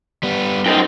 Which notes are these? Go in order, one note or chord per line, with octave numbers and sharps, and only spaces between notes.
G3 B3
F#2 D#4 C5 G5